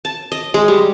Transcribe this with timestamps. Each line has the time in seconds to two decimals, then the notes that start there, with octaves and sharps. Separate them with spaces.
0.05 A5
0.32 D#5
0.54 G#3
0.68 G3